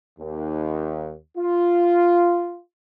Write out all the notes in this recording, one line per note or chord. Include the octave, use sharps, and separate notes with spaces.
D#2
F4